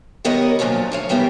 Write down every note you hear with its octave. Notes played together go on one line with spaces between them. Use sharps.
D#3 G3 B3 A#4 C#5 D#5
F#2 A#2 F3 F#3 D4
D2 C#5 F5
E3 G3 B3 G4 A#4